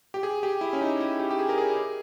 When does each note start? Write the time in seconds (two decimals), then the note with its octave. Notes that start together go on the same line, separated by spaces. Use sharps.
0.14 G4
0.23 G#4
0.43 G4
0.61 E4
0.73 C#4
0.81 D#4
1.01 E4
1.19 G4
1.31 G4
1.39 G#4
1.49 A#4
1.58 G#4
1.77 G#4